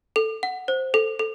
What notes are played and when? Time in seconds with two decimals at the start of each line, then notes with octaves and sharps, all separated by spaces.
0.16 A4
0.43 F#5
0.68 C5
0.94 A4
1.19 A4